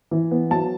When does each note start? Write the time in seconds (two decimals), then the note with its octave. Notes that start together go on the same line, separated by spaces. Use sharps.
0.11 E3
0.31 B3
0.51 F#3 A5